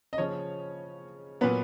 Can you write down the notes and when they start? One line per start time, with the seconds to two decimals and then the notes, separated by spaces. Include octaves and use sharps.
0.13 D#5
0.18 C#3 F3 C#4 C#5
1.41 A#2 F#3 B3 B4